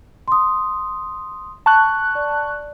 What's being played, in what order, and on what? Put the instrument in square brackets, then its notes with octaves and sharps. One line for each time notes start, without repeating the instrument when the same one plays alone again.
[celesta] C6 D#6
[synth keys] A5 C#6 F#6
[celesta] D5